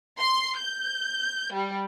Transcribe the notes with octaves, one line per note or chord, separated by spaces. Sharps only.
C6
G6
G3